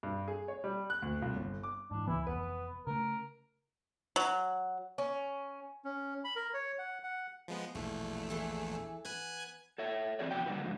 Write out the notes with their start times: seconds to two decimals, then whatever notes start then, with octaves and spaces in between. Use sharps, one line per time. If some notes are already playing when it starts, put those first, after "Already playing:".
0.03 G2
0.28 G#4
0.48 C#5
0.64 G3
0.90 F#6
1.02 D2
1.22 C2
1.36 G1
1.63 D6
1.91 G#2 E3 D4
2.08 C#2 E3 B3 E4
2.27 F1 B3 B4
2.87 C#3 A3 A#4
4.16 F#3
4.98 C#4
5.85 C#4
6.24 B5
6.36 A#4
6.54 C#5
6.79 F#5
7.03 F#5
7.48 F3 G#3 B3
7.75 A#1 E2 B2 A3
8.30 E3 G#4 A4
9.05 B3 B4 G#5 F#6 G#6
9.78 A4 C#5 E5
10.19 E3 C4 F#4 G#4 C#5 D5
10.31 C3 F3 F#4 G5
10.46 D3 G3 A#3 D#4 F#4 B4
10.62 G#2 D3 F3 G#3